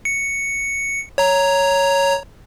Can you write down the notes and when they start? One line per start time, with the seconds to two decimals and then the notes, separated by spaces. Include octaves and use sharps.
0.05 C#7
1.18 C#5 A#5